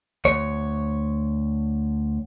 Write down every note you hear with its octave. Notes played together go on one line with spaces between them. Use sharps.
D2 C#5